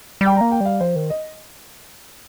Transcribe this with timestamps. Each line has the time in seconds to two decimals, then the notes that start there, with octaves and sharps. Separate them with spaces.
0.21 G3
0.26 G5
0.36 A#3 A#5
0.51 G5
0.61 G3 F5
0.80 F3 C5
0.96 D#3
1.10 D#5